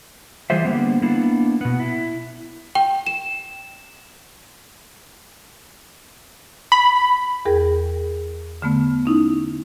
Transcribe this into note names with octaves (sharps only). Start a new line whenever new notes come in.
E3 G3 F4 G#4 C5 E5
D3 G3 A#3 B3
A#3 B3 D4 E4
B2 B3
E4
G5
E7
B5
E2 G#4 A#4 G5
D3 A3 B3
C#4 D#4 E4